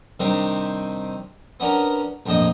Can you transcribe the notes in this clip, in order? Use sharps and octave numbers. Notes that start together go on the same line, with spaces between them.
C3 D#3 G3 C4 D4
B3 C#4 D4 A#4
A#1 F2 A2 D4 D#5